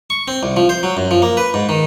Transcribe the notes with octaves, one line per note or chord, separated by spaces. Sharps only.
C#6
C4
C2
F3
C5
F#3
F#2
F3
A#3
B4
G#2
D#3